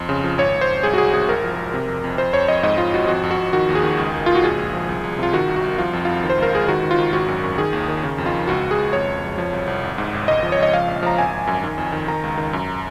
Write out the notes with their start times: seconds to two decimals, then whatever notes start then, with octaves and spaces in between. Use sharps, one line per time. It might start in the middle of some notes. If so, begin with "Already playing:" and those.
Already playing: F2 C6
0.09 C#3
0.24 F3
0.38 G#1 C#5
0.54 G#1
0.61 C5
0.68 G#1
0.83 C2 G#4
0.94 F#4
0.98 C2 G#4
1.13 C2 G#4
1.28 G#1 A#4
1.44 F3
1.59 G#1
1.74 C3
1.88 F2
2.04 F2
2.18 F2 C5
2.33 F2 C#5
2.48 F2 D#5
2.63 G#2 D#5
2.78 G#2 F4
2.94 G#1 F#4
3.08 F2 F#4
3.23 F2
3.31 F#4
3.38 F2
3.53 D#3 F#4
3.69 D#2
3.75 G#4
3.83 D#3
3.98 C#2
4.14 C#2
4.26 C#2 F4
4.35 F#4
4.43 A#1 G#4
4.58 A#1
4.73 F3
4.89 C2
5.04 C2
5.19 C3 F4
5.33 D#3 F#4
5.48 C2
5.56 F#4
5.64 C2
5.78 F3 F4
5.93 F2
6.05 F2 F4
6.24 D#3
6.30 C5
6.38 C#2 A#4
6.53 C#2 G#4
6.68 D#3 F#4
6.83 D#3
6.91 F4
6.99 D#3
7.13 G#1 F#4
7.28 F#2
7.44 F#2
7.58 D#3 G#4
7.73 D#2
7.88 D#3
8.03 C#3
8.18 F2
8.26 F4
8.34 F2
8.47 C#2 F#4
8.63 C#2
8.71 G#4
8.78 C#2
8.93 F2 C#5
9.08 F2
9.23 F2
9.38 F3
9.53 C2
9.67 C2
9.83 G#1
9.98 G#2
10.13 G#1
10.28 C#2 D#5
10.43 F3
10.52 C#5
10.58 C#2 D#5
10.73 F3 F5
10.88 A#1
11.03 F3 A#5
11.18 G#1 G#5
11.33 G#1
11.47 F#2
11.64 D#3
11.78 F2
11.92 D#3
12.08 D#3 A#5
12.23 C#2
12.37 D#3
12.53 F#2